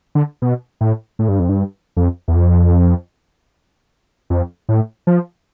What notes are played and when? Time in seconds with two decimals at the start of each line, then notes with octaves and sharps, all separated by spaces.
0.15 D3
0.42 B2
0.81 A2
1.19 A2
1.29 G2
1.39 F2
1.49 G2
1.97 F2
2.28 E2
2.36 F2
4.30 F2
4.69 A2
5.07 F3